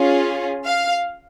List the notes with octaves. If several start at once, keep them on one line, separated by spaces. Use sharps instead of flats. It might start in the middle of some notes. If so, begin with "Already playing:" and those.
Already playing: C#4 F4 G#4
F5